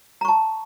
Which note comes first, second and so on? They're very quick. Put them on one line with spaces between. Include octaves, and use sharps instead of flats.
A#5 C#6 A5